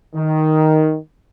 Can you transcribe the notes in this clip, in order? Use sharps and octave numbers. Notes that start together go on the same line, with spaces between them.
D#3